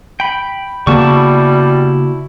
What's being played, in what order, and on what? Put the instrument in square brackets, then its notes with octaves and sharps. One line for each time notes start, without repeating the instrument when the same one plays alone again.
[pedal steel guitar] G5 B5
[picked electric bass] C#3 A#3 B3 [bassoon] G3 [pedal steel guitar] E4 A5 C#6 [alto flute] F#4